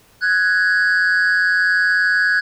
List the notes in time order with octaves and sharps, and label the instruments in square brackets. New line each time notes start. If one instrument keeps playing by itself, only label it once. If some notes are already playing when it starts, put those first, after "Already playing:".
[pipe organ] F#6 G#6